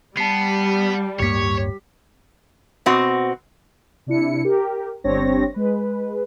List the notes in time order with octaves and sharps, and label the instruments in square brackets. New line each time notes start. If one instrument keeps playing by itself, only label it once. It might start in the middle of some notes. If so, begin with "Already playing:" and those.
[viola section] G3 [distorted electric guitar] B3 [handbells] A5 C7
[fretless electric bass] D1 G2 A#3 [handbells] G4 B6 [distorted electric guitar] C#5
[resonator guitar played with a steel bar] B2 C4 F#4
[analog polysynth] C3 D4 E4 C#7
G4 A#4
G1 G3 C4 D4 C#5 A#6
G#3 B4